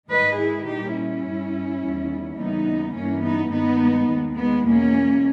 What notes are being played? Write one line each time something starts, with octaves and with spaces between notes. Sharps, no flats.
G#2 D#3 G#3 B4 D#5
E4 G#4
A#2 G3 D#4 G4
C#4 E4
G2 G3
E2 D#3 G3
D#2 C#3 E3 G3 B3 D#4
G2 E3 G3 A#3 C#4
B3 D#4
G2 D#3 G#3 B3 D#4
D#2 D#3 G#3
G#3 B3
E2 B2 G#3 A#3 C#4